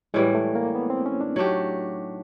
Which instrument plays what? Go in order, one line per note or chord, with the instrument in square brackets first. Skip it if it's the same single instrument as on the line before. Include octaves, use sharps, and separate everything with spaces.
[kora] A2 E3 G3 [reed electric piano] G#3
[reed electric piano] A3
A#3
B3
C4
C#4
D4
[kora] F#3 A3 D4 G4 [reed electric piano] D#4